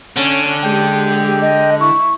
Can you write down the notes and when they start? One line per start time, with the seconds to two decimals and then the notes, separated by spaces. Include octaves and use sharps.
0.16 D3 C#4
0.63 G#3 G4 G5 G6
1.42 D#5
1.80 E4 C#6